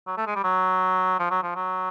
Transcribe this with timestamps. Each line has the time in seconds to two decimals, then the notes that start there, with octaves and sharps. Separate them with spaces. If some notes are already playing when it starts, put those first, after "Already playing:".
0.07 F#3
0.17 A3
0.27 G#3
0.36 G3
0.44 F#3
1.19 F3
1.31 F#3
1.43 F3
1.55 F#3